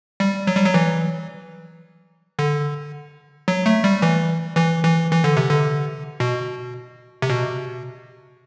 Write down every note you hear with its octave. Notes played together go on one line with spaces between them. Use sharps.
G3
F#3
G3
F#3
E3
D3
F#3
A3
G3
E3
E3
E3
E3
D3
C3
D3
B2
C3
B2